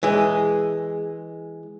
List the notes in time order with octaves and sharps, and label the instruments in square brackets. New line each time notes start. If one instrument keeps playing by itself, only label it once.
[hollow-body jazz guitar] E3 G#3